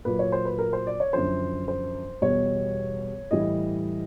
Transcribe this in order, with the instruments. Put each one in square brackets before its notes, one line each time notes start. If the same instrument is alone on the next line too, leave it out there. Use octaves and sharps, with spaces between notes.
[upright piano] A#2 F#3 B4
C#5
C5
B4
A#4
C5
D5
C#5
F#2 D3 F3 C5
C5
E2 B2 G3 C#5
A2 E3 G3 D#5